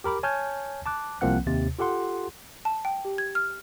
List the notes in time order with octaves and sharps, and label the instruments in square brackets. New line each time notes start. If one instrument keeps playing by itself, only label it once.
[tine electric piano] G4 A#4 B5 D6
C#5 G#5 A5 F6 G6 G#6
A5 D6 F#6
C2 F3 A#3 C4 F#5 F#6
D#2 C3 A6
F4 G4 A4 F#5 C6
[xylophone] A5
G5
G4
G#6
F6